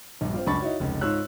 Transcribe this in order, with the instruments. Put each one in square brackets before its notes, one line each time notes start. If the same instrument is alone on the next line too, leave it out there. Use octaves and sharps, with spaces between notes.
[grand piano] A#1 G2
C4 F4
C#2 F#2 D4 B5 C#6 A6
D#4 E4 F#4 C#5
F1 C#2
G#2 F4 C#5 E6 F#6